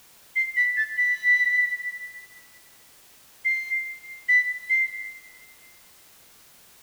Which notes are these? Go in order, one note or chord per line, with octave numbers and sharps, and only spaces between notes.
C7
B6
A6
B6
C7
B6
C7